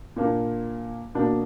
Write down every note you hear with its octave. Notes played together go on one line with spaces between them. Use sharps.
A#2 A#3 D4
B2 A#3 D4